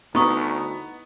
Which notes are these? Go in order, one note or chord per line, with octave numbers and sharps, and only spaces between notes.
D2 B3 D#4 E4 C#6 D#6